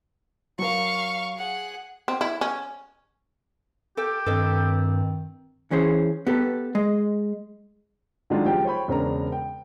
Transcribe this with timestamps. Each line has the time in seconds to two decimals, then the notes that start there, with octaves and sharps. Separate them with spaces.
0.59 F#3 A#4 F5 C#6
1.37 G#4 F#5
2.08 C4
2.21 E4
2.41 C#4
3.97 G4 A4 G5
4.26 G2 D#3 C4 A4 B4 D#5
5.71 E3 C#4 G#4 C5
6.27 B3 G4 A4
6.75 G#3 D#5
8.30 D3 D#3 F#3 G#3 D4 F4
8.46 C#2 F3 F4 G4 G5
8.65 C5 C#5 G5 B5
8.88 E1 C#3 C4 D4 A#4 A#5
9.32 G5